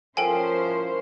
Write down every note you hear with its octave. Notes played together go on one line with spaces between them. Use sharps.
F3 C#4 E4 A4 A#4 C5 G5 G#5